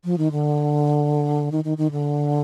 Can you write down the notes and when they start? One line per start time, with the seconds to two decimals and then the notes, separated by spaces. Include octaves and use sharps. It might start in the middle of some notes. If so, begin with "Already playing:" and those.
0.04 F3
0.18 D#3
0.32 D3
1.52 D#3
1.64 D#3
1.78 D#3
1.91 D3